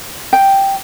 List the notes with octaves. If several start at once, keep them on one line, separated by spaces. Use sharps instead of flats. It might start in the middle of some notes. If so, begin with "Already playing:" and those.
G5